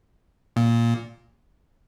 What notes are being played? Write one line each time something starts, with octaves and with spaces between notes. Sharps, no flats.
A#2